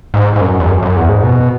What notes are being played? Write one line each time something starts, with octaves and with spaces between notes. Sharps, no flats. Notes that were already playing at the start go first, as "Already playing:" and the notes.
G#2
G#2
F#2
E2
F#2
F#2
E2
G#2
B2